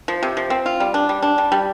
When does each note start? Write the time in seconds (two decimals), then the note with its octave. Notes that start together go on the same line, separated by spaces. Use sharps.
0.08 F3
0.23 C3
0.37 F3
0.50 C4
0.66 F4
0.80 G3
0.94 D4
1.09 G3
1.23 D4
1.38 G3
1.52 G3